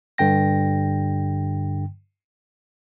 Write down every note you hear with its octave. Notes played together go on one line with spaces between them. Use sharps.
G2 D3 G5 A#6